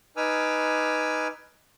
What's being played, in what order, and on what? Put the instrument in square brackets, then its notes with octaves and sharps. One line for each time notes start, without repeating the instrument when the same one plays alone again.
[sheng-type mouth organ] D#4 B4 G#5 D6 E6 F6